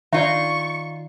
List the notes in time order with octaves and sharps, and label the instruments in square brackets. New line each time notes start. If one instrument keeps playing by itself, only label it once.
[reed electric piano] D#3 [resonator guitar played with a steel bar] D#4 F4 [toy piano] D5 E5 [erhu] C#6